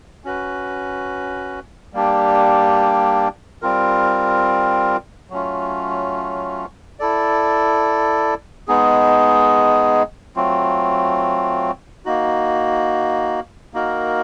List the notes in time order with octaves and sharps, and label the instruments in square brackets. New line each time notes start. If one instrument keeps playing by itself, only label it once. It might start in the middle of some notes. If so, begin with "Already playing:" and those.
[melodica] C#4 F#4 B4
G3 A#3 D4 G4
G3 C4 F4 A#4
F#3 A3 C#4 F4
E4 A4 D5
G#3 B3 D#4 G#4
F#3 A3 C4 F4
A#3 D#4 F#4
A#3 D#4 F#4 A#4